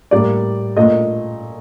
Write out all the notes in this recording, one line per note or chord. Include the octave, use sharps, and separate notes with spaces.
A2 G3 A#3 D5
A#2 A3 D#5